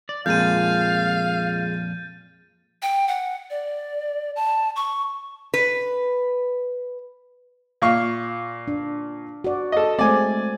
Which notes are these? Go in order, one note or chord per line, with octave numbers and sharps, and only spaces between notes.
D5
F2 A#2 G#3 F5 G6 A6 D#7
G5
F#5
D5
A5
C#6
B4
A#2 F5 C#6
D4
F#4 D5
A4 D#5
G#3 A3 C4 D5 G#5